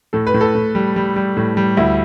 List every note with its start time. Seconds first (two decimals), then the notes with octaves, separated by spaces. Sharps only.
0.13 A2 A4
0.27 B4
0.34 A2
0.41 A4
0.55 A2
0.75 G3
0.96 G3
1.16 G3
1.37 A2
1.57 G3
1.77 D2 E4